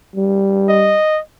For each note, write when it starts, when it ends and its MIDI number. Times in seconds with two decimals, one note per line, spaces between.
0.16 0.97 55
0.69 1.20 75